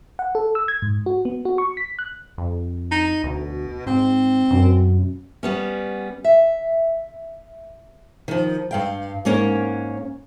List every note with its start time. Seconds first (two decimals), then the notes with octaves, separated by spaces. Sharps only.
0.19 F#5
0.35 A4
0.55 E6
0.68 G#6
0.82 G#2
1.06 F#4
1.25 B3
1.45 F#4
1.58 C#6
1.77 B6
1.99 F#6
2.38 F2
2.91 D#4
3.24 D2 B2
3.87 G#2 C4
4.51 F#2 B2
5.43 G3 B3 C#4
6.24 E5
8.28 D#3 F3
8.71 G2 F5 G5
9.25 G#2 A#3 C#4 A#4 C#5